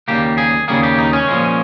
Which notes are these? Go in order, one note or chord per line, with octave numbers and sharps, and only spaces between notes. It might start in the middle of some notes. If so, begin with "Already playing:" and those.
D#2 C#3 G3 A#3 G4
G#4
D#2 C#3 G3 A#3 G#4
G4
D#4
C#4
A#2 F3 G#3